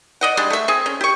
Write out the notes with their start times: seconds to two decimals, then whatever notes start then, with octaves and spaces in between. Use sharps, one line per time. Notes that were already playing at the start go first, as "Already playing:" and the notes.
0.21 D5 D#5 F#5
0.37 G3 G#3 D4
0.50 A3 E5
0.68 C4 G#4
0.86 C#4
1.01 G4 C#6